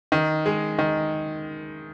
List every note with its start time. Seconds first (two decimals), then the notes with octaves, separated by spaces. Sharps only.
0.12 D#3
0.46 G#3
0.79 D#3